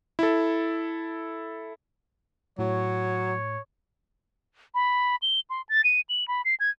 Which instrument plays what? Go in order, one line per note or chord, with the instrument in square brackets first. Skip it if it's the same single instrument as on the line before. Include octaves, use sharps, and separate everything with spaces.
[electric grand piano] E4 A4
[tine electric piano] A2 [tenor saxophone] F#3 [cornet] C#5
[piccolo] B5
G7
C6
A6
D#7
F#7
B5
C7
G#6